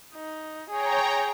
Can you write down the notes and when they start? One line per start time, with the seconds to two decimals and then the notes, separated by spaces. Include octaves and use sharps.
0.13 D#4
0.70 G#4 C#5 G5 A#5